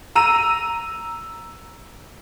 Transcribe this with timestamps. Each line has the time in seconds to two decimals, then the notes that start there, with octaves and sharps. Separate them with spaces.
0.15 A#5 E6 D#7